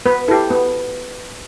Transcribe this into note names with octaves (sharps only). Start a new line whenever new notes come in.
B3 B4
E4 G4 A4
B3